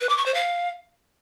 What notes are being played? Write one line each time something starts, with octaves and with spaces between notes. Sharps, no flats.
B4
D6
C#6
C5
F5